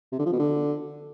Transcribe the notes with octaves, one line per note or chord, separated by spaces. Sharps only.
C3
D3
F3
B2
D3